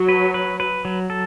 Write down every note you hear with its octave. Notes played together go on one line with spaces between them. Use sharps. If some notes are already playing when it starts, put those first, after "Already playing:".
Already playing: F#3
B4
B4
B4
F#3
A4